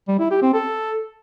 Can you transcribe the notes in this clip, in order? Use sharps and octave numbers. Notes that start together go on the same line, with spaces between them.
G3
E4
G4
C4
A4